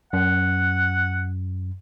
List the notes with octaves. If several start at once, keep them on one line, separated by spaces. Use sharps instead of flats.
F#2 F#5